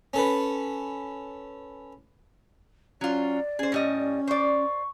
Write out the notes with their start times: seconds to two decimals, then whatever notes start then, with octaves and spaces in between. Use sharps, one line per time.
0.13 C#4 A4 B4
3.01 F#3 C#4 F4 D5
3.59 C#4 G#4 C5
3.72 A2 G3 D#5
4.27 C5 D5 C#6